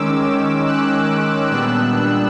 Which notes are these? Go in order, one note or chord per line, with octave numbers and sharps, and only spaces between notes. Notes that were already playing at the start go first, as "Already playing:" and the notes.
Already playing: D#3 G#3 C#4 D6 E6
E6 F#6
A#2 G3 B3 D4 E6 F#6